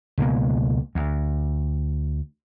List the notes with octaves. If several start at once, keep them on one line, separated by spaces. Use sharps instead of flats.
C#2 B2 G#3 A#3
D2